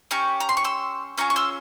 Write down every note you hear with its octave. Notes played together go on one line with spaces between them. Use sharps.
C#4 G4 A#5 C#6
A#5
C6
C#6
C6 E6
C#4 F4 G#4 A#5 C#6
C#6
C6 E6